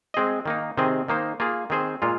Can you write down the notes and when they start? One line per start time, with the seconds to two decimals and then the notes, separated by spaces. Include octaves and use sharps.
0.14 G#3 C4 G#4 D#5
0.46 D#3 A#3 D#4
0.77 C3 D#3 C4 G#4 D#5
1.08 D#3 A#3 D#4 C5
1.40 A#3 F4 G#4
1.70 D#3 C4 G#4 C5
2.02 A#2 G#3 F4